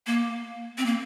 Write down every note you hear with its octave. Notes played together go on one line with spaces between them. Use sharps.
A#3
C4
A#3